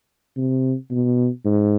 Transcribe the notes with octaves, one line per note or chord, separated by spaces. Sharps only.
C3
B2
G#2